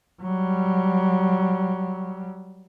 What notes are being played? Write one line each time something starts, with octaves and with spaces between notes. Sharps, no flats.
F#3 G3